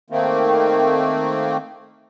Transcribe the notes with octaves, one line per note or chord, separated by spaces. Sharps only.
D#3 A3 A#3 C4